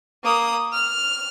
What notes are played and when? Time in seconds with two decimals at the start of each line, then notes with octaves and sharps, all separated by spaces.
0.24 A#3 D#6
0.73 F6